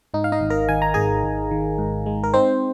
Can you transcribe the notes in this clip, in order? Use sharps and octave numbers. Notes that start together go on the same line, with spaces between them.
G#2 D#4
F5
D#4 D#5
G#1
A#4 A#5
D#3 G#5
A#5
G#1 G#4 G#5
G#1
D#3
G#2
G#3
A#4
C4 D#4 C5